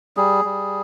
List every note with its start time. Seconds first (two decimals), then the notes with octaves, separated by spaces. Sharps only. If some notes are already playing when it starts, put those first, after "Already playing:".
0.17 G3 G#4
0.45 G3